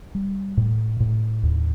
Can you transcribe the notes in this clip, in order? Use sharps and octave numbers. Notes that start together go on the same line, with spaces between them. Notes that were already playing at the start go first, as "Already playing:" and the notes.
G3
A2
A2
D#2